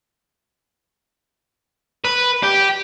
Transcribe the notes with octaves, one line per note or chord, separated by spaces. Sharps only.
B4
G4